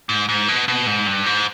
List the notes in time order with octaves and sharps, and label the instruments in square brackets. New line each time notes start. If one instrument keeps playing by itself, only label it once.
[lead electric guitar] G#2
G#2
B2
B2
G#2
G2
G#2